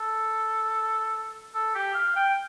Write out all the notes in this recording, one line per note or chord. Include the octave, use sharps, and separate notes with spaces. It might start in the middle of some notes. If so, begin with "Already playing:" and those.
Already playing: A4
A4
G4
F5
G5